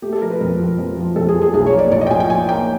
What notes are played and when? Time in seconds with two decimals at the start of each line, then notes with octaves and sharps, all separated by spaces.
0.02 A3 G4
0.13 A4
0.21 F3 A#4
0.30 B4
0.41 F2 A#4
0.60 F3
0.79 F2
0.98 F3
1.16 F2 A4
1.29 G#4
1.35 F3
1.42 G#4
1.54 B1 G#4
1.66 C#5
1.73 A#3
1.79 D5
1.91 A2 D5
2.01 D#5
2.07 G5
2.10 F3 G#5
2.20 G5
2.30 F3 G#5
2.49 A#3 G5